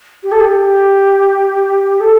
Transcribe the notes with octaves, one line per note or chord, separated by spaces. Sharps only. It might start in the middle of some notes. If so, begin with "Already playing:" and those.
G4
A4
G4
A4